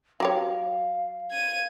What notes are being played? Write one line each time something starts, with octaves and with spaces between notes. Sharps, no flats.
F#3 G4 C#5 F5
G#6 D#7